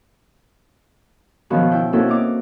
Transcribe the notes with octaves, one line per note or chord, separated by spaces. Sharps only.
B2 D#3 F3 B3 C#4 F#4
E4 G5
A#3 C4 C#4 E4 F#4 A4
D#4 D6